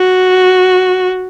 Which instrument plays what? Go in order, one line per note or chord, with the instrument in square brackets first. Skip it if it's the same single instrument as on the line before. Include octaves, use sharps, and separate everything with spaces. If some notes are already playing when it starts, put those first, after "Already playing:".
Already playing: [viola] F#4